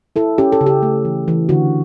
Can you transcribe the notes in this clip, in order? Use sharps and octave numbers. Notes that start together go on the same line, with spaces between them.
E4 A4
C#4 G4
A4
C#3
G4
A3
E3
E3
D3 F#4